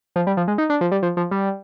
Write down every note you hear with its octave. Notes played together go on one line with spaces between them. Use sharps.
F3
G3
F3
G#3
D#4
D4
F3
G3
F3
F3
G3